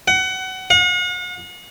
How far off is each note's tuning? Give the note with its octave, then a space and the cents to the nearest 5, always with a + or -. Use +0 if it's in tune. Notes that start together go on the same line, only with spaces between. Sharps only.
F#5 +25
F#5 -45